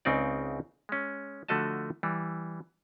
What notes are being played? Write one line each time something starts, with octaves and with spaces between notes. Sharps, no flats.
C#2 C#3 C4 D#4 D5
G#3 C#4
D3 F3 A3 F#4 D#5 A5
E3 G3